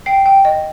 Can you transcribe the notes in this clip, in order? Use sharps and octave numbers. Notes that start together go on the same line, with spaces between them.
G5 C7
G5
D#5